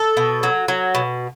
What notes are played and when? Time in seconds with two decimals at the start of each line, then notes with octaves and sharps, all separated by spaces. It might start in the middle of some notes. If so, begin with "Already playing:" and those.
Already playing: A4
0.17 B2
0.43 F#3
0.68 F#3
0.95 B2